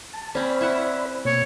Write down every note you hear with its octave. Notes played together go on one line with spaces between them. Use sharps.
A5
C4 C#4 C5 D5 B5
E4 E5 F#5
B2 A#3 C#5